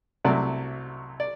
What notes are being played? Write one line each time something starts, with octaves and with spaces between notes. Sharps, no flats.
C2 C3 F#3 A3 D5
D5